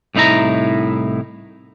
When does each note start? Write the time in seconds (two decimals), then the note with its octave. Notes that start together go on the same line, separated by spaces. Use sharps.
0.15 C2 A2 D#4 E4 A#5